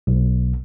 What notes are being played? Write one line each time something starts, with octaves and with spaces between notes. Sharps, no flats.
B1